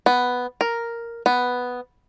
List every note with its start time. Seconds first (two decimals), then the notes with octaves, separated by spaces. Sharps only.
0.06 B3
0.61 A#4
1.26 B3